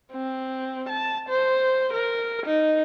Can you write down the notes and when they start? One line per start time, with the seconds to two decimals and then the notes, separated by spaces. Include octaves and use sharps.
0.12 C4
0.89 A5
1.29 C5
1.93 A#4
2.46 D#4